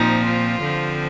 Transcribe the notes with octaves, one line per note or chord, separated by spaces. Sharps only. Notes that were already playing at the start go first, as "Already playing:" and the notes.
Already playing: A#2 F3 C4 D#4
F4
D3 F3 C4